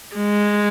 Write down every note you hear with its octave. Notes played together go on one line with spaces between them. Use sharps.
G#3